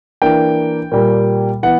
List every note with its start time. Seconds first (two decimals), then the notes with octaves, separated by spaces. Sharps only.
0.22 E3 A#3 D4 G5
0.92 A#2 G3 A#3
1.63 E3 B3 F#5